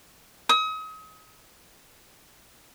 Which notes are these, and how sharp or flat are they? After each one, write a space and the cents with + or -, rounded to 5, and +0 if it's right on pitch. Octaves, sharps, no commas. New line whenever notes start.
D#6 +35